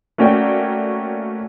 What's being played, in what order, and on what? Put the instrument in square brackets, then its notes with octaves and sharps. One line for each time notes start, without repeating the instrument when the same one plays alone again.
[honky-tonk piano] A3 A#3 C#4 F#4 D5 G5